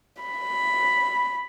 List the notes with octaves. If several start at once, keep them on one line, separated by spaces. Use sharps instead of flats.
B5